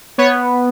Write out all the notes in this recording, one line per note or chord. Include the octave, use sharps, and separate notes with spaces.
B3 C#5